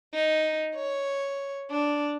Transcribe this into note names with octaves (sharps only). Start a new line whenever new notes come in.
D#4
C#5
D4